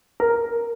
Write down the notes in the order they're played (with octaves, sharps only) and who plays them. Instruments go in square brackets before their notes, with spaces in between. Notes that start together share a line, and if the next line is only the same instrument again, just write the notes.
[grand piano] A#4